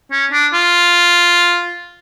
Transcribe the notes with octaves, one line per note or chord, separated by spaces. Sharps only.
C#4
D4
F4